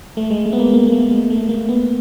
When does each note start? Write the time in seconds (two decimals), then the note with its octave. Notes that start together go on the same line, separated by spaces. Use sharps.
0.17 A3
0.30 G#3
0.45 A3
0.53 B3
0.59 A#3
0.73 A#3
0.87 A#3
0.92 A3
1.11 G#3
1.30 A3
1.49 A#3
1.69 B3